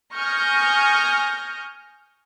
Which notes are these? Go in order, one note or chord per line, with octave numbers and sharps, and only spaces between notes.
G#5 C#6 D#6 F6 G6 A#6